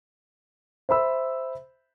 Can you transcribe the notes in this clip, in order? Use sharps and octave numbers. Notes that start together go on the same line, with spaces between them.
C5 E5 B5 E6